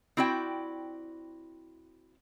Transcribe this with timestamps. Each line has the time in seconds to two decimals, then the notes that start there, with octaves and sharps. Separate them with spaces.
0.17 C4 E4 F#4 D5 G5